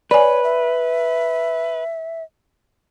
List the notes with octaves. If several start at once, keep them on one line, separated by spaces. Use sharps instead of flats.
B4 C#5 D5 G#5
E5